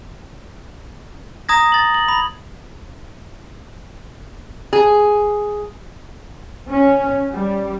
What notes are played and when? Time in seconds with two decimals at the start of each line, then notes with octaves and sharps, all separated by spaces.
1.49 A#5 D#6 G#6 A#6
1.72 A6 F#7
1.94 F#7
2.08 B5
4.73 G#4
6.69 C#4
7.33 G3